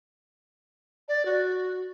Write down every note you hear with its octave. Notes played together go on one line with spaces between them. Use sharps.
D5
F#4